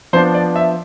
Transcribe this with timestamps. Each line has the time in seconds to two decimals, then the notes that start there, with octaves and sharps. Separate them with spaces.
0.13 F3 B3 D4 C5
0.34 D5
0.56 E5